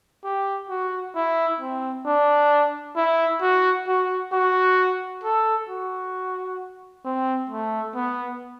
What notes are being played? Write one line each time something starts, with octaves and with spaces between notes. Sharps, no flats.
G4
F#4
E4
C4
D4
E4
F#4
F#4
F#4
A4
F#4
C4
A3
B3